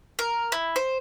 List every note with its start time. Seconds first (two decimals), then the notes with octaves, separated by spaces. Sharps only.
0.19 A#4
0.52 E4
0.76 C5